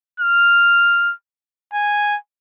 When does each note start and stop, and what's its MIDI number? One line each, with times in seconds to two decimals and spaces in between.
0.20 1.13 89
1.73 2.17 80